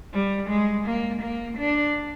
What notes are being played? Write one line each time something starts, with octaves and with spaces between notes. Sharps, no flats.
G3
G#3
A#3
A#3
D4